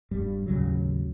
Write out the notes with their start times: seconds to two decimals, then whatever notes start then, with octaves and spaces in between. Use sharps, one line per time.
0.11 E1 G2 G3
0.46 A1 D#2 C#3 F#3